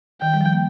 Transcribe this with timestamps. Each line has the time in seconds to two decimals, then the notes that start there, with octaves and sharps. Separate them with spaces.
0.21 D#3 G5
0.34 G3
0.41 F3
0.53 A#3